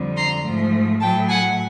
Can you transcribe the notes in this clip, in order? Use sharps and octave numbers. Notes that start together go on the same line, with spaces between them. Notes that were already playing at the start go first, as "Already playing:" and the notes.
Already playing: F2 D3 G3
A#5 C6
G#2 F3 A3
A2 F#3 A3 G5 A5
F#5 G#5